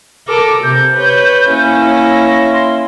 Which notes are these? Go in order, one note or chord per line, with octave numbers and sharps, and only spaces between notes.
A4 A#4 D6
C3 G6
B4 C#5
A#3 C#4 E4
A#6
C6